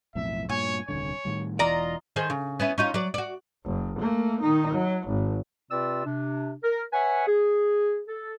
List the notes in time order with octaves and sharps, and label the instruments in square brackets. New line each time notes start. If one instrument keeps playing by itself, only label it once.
[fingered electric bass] B1 F2 A2 [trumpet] E5
[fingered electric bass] G2 A#2 [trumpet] C#5 [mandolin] G#5
[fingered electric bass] D#1 C2 D3 [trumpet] C#5
[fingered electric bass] A2 D#3 G3
[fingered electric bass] E1 E3 [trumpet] F4 [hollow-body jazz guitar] D5 [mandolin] D#5 A#5
[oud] D#3 G#4 C5
C#3
B3 C#4 E4
C#4 D#4 F4
F#3 D5
F#4 D5
[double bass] F#1
A3 A#3
D#3 D#4
F#3
G#1
[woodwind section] C3 C4 F4 B4 D5 E6
C3 D4
A#4
B4 C#5 E5 F#5 G#5
G#4
A4